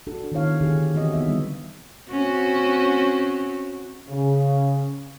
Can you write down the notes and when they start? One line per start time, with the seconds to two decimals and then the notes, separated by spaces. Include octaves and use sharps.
0.07 D4 F#4 A4
0.32 D#3 B3 E4 C#5 F5
0.61 D3 D#3 G4 G#4
0.94 E3 C4 F#4 D#5
1.13 D3 B3 D#4 E5
1.25 D3 G3
2.10 C4 C#4 F#4
4.09 C#3